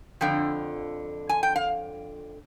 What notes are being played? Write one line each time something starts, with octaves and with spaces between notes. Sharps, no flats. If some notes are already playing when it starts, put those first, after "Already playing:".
F2 D3 F3 G5
G#5
G5
F5